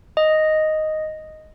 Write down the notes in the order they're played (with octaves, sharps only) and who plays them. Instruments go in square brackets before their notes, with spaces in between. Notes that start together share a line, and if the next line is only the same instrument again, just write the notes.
[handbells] D#5